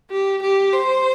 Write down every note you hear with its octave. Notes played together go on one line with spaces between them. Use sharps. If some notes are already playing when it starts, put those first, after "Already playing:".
G4
G4
C5